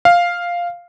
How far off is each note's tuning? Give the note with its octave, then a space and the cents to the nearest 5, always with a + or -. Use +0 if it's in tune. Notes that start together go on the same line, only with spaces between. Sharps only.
F5 +0